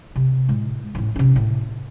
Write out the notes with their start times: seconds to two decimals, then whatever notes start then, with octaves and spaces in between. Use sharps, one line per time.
0.16 C3
0.49 A2 G#3
0.95 A1 A2
1.16 C3 C#4
1.36 A2